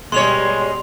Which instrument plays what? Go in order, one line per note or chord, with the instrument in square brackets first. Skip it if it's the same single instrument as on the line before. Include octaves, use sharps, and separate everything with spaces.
[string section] B2 G3 [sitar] G#3 C#5 [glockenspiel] C6 F7